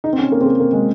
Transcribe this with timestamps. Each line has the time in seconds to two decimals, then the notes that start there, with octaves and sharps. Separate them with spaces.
0.04 D#4
0.13 C4
0.19 C#4
0.32 A#3
0.41 C4
0.46 A#3
0.60 A#3
0.73 G#3